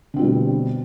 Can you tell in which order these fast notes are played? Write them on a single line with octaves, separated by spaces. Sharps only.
D3 C4 F4 G3 B2